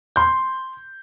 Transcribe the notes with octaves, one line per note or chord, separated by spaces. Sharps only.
C6 G6